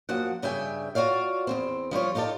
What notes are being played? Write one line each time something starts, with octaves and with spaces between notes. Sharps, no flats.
F#2 F3 A#3 F#5
G2 C#3 G3 E5 G5 G#5
F4 F#4 C#5 D5 F5
E2 G#2 C4
F3 G3 F4 C#5
D#4 F4 G4 A4 D5